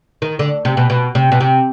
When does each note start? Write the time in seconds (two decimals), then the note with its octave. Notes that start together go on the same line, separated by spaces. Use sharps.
0.22 D#3
0.39 D3
0.65 C3
0.77 B2
0.90 B2
1.15 C3
1.32 B2
1.41 C3